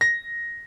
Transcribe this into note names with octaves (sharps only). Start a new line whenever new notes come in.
A#6